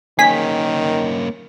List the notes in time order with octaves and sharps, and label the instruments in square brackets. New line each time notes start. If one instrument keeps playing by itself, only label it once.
[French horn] D#3 [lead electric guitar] A#3 C#4 [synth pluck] G#4 B6